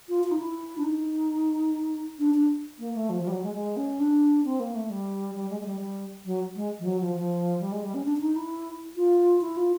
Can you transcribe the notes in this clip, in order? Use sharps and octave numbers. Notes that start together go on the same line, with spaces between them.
F4
F4
D#4
E4
D4
D#4
D4
D4
A#3
A3
F3
F3
G3
F#3
G#3
G#3
C#4
D4
C4
A#3
A3
G3
G3
G#3
G#3
G3
G3
F#3
G#3
F3
F#3
F3
F3
G3
G#3
G3
C#4
D4
D4
D#4
E4
F4
E4
F4